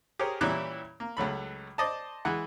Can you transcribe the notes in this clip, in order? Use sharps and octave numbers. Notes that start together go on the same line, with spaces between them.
G4 G#4 A#4 C5 C#5
A#2 E3 G3 C#4 E4 F#6
A#3
C#2 F#3 A3 B5
C5 D5 D#5 A5
E3 G#3 F#5